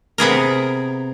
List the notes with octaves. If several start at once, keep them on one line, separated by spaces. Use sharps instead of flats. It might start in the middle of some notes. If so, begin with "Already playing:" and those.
C3 B3 G#4 A#4